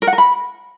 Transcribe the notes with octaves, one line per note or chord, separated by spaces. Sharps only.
A#4
F#5
A#4
B5